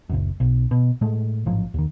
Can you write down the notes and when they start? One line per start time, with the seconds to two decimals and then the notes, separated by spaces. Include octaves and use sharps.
0.09 F#1 C#2 F#2
0.40 B1
0.71 B2
1.01 A2 G#3 A3
1.46 A1 G#2 F3 F#3
1.74 D#2 D#3